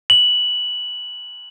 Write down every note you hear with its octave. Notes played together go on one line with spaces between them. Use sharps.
F#7